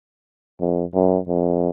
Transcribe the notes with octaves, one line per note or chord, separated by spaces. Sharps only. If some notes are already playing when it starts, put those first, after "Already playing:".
F2
F#2
F2